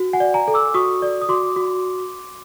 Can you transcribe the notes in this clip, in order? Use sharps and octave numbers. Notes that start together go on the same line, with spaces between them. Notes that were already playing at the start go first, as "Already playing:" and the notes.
Already playing: F#4
F#5 G#5
D5
G#5 A#5
A4
D6 E6
F#4 C#6 D#6
D5
D#6
F#4 C6 D6
F#4